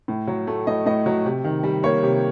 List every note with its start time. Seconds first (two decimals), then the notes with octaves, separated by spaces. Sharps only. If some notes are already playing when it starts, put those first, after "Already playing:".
0.08 A2
0.27 F#3
0.47 A3
0.67 A2 D#5
0.86 A2 D#5
1.06 F#3
1.25 C3
1.44 D#3
1.63 G3
1.83 A#3 C#5
2.03 C3